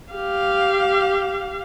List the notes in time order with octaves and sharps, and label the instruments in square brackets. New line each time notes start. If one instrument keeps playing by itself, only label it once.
[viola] G4 F5